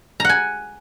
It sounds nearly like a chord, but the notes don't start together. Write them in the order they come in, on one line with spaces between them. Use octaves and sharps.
A#5 F#5 G#5